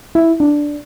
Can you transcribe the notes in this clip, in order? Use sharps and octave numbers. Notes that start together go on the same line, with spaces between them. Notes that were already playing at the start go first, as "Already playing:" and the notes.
E4
D4